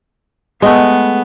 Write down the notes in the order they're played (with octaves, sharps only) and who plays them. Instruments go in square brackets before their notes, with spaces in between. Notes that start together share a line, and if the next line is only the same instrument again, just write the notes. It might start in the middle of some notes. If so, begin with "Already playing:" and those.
[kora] G#3 A3 [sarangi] B3